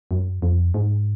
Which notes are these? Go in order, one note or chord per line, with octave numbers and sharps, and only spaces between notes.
F#2
F2
G#2